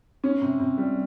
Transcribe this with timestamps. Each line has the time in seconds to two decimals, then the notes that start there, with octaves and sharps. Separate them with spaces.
0.24 C#4
0.42 C3
0.60 C3
0.78 G3